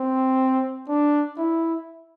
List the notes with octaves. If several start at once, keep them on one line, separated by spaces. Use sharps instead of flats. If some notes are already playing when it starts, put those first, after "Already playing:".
Already playing: C4
D4
E4